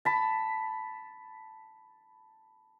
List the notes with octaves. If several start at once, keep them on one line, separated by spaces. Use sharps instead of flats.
A5 B5